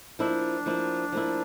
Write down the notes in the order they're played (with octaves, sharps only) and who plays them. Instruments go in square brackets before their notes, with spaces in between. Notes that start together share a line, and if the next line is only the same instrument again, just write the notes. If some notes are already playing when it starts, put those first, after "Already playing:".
[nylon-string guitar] F3 A#3 E4 [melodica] D4
[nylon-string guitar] F3 A#3 E4
F3 A#3 E4